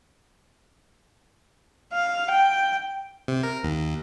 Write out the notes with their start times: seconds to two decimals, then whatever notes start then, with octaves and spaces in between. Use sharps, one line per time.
1.93 F5
2.31 G5
3.28 C3
3.43 A#4
3.63 D#2